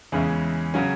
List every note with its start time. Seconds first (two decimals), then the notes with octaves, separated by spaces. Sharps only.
0.12 E2 C#3 G#3 C#4 E4
0.74 C#3 F#3 C#4